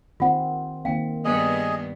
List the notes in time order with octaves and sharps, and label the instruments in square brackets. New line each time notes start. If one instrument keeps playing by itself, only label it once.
[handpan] D#3 C4 [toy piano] F4 F#5
[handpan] D#3 A#3 C4 [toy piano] F5 G5
[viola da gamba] G2 B3 [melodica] G#4 D#5